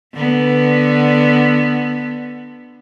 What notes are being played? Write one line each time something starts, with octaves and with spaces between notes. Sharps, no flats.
D3 B3